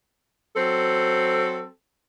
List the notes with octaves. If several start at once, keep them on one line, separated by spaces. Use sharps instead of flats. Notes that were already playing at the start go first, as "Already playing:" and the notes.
F#3 C4 A4